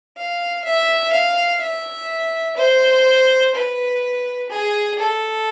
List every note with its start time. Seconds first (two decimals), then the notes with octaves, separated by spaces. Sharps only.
0.17 F5
0.65 E5
1.13 F5
1.61 E5
2.57 C5
3.54 B4
4.50 G#4
4.98 A4